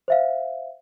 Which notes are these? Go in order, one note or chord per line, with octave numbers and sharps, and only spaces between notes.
C5 E5 F5